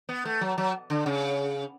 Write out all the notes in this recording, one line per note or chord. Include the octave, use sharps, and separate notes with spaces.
B3
A3
F#3
F#3
D3
C#3